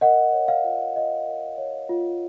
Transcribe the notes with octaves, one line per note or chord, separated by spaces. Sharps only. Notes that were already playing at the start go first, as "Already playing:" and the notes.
A#4 D#5 F#5
C#5
F5
F4
F4 D#5
A#4
C#5
F4